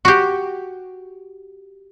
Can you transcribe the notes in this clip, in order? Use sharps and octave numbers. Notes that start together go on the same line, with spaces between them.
F#4 G4